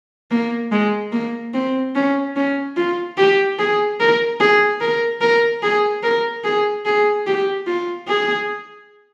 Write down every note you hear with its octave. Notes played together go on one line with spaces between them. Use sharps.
A#3
G#3
A#3
C4
C#4
C#4
F4
G4
G#4
A#4
G#4
A#4
A#4
G#4
A#4
G#4
G#4
G4
F4
G#4